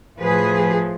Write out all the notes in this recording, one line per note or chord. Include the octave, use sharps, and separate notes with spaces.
A2 F3 G#4 B4